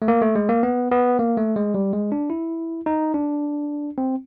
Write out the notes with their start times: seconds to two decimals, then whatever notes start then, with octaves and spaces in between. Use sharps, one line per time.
0.02 A3
0.08 A#3
0.22 A3
0.35 G#3
0.49 A#3
0.63 B3
0.91 B3
1.19 A#3
1.37 A3
1.56 G#3
1.74 G3
1.93 G#3
2.12 D4
2.30 E4
2.86 D#4
3.14 D4
3.98 C4